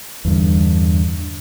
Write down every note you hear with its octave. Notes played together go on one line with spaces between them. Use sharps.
E2 G2 D3